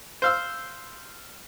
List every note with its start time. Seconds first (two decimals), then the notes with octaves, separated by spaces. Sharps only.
0.22 C5 F5 E6